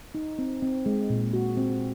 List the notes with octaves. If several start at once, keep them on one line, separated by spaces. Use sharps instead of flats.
D#4
C4
C4
G#3
A#2
F#4
C4